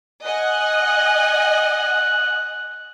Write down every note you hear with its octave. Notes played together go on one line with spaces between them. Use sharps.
D#5 F#5 G#5 F#6